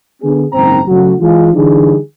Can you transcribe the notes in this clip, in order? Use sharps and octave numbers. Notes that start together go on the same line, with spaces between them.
D3 B3 G#4
F#1 G#2 D#3 C4 C5 A#5
C#3 F#3 A3 F#4
E3 G#3 F4
D3 E3 G3 D4 D#4 G#4